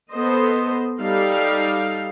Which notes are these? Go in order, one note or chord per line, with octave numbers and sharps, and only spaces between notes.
B3 A4 C5 D#5
G3 D#4 A4 F5